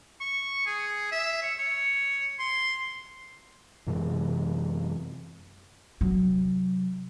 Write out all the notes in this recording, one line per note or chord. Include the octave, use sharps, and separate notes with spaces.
C#6
G#4
E5
C#5
C#5
C6
F#2 C3 E3 G#3
C3 F#3